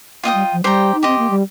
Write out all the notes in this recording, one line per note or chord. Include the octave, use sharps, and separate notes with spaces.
A#3 F4 D#5 G5 D#6
G3
F3
G3 G4 C5 G5 A#5
D#4
C4 G4 D#5 C6
A#3
G3